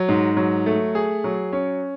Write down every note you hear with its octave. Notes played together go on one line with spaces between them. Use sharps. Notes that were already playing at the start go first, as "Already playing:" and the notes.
Already playing: F#3
G#2
F#3
A3
G#4
F#3
C#4